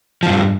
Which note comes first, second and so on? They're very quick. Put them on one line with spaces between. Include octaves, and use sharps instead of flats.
F3 E2 G2